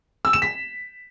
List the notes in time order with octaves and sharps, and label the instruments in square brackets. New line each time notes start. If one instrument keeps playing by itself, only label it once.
[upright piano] E6
E7
B6